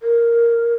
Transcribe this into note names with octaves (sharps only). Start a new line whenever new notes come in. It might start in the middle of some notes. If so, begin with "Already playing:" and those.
A#4